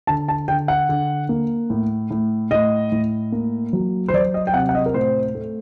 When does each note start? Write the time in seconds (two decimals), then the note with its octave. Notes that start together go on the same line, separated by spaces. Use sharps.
0.07 D3 A5
0.28 A5
0.48 D3 G5
0.68 F#5
0.89 D3
1.29 A#3
1.70 A2
2.11 A2
2.51 A2 D#5
2.92 A2
3.32 A#3
3.73 F#3
4.08 C5
4.13 F#3 D5
4.34 D#5
4.47 G5
4.54 C3 F#5
4.69 F#5
4.75 D#5
4.86 A#4
4.94 A2 C5
5.35 A3